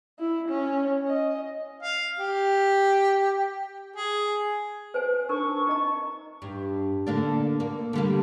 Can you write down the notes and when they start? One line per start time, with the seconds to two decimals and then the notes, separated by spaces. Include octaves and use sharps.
0.19 E4
0.49 C#4
1.08 D#5
1.83 F5
2.19 G4
3.96 G#4
4.94 B4 C5 G#5
5.29 D4 D#4 A#4 C#6
5.67 D#4 D#5 A#5
6.42 G2
7.07 D3 A#3 D4
7.60 A#3
7.93 D3 G3 A#3